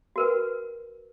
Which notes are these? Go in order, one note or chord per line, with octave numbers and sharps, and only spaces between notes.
F#4 A#4 B4